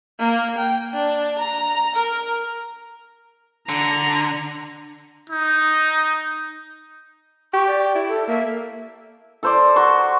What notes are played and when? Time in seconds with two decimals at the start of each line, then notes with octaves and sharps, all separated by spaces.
0.19 A#3
0.58 G5
0.94 D4
1.39 A#5
1.96 A#4
3.69 D3 A#5
5.30 D#4
7.54 G4 C#6
7.67 D5
7.95 E4
8.08 A4
8.28 A#3 E5
9.43 A4 C5 D5
9.76 F#4 A#5 C6 C#6